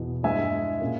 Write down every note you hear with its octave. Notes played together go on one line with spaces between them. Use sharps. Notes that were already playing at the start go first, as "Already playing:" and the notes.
Already playing: E2 B2
G2 E3 G#3 E5 G#5
A#2 A#3 C#4